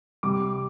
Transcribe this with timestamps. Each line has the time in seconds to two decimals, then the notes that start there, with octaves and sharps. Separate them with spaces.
0.23 C3 G3 D6